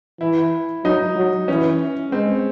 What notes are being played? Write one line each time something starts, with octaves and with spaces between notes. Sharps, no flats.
E3 E4
F#3 D#4
F#3
E3 C#4
G#3 C4